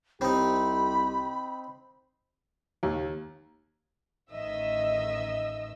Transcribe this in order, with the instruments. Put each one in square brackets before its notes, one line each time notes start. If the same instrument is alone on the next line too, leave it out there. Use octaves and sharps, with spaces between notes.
[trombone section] C2 G4 [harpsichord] C4 D#4 [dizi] B5
[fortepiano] D#2
[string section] A1 D#3 D#5 E5 E6